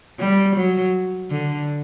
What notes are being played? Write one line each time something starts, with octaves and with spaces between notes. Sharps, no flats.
G3
F#3
D3